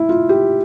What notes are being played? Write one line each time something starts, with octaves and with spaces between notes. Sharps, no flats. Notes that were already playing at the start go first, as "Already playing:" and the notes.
Already playing: E4
F4
G4